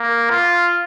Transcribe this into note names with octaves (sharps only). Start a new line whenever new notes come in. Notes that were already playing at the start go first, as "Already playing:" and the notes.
Already playing: A#3
F4